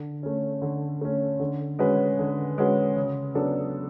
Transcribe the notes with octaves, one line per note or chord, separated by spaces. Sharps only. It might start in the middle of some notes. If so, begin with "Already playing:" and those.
Already playing: D3
A3 C#4
D3
A3 C#4
D3
G#3 C#4 F#4 B4
D3
G#3 C#4 F#4 B4
C#3
F#3 B3 D4 A4